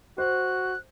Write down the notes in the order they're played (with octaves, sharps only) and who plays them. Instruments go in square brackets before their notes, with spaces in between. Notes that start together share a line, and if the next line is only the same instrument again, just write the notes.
[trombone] F#4 [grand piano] C5 [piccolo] F#6